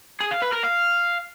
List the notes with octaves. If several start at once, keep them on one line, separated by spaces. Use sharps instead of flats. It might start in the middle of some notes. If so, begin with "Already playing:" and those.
G#4
F5
B4
A#4
F5